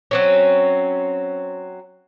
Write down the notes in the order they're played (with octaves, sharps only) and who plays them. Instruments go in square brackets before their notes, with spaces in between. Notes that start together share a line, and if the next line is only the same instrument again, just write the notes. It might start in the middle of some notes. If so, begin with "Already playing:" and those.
[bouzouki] F#3 C4 C#4